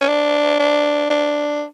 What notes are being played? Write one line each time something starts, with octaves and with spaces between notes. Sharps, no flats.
C#4
D4
D4
D4